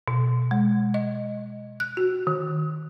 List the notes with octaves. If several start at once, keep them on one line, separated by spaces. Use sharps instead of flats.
B2
G#3
D#5
F#6
F#4
D#3